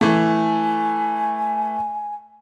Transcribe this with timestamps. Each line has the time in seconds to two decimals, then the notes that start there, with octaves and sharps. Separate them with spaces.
0.01 E3 A3 G#5